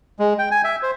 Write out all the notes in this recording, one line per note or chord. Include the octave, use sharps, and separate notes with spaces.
G#3
G5
G#5
E5
C5